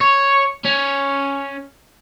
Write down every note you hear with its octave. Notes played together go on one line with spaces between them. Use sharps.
C#5
C#4